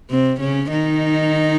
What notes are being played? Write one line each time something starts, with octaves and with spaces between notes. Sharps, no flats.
C3 C4
C#3 C#4
D#3 D#4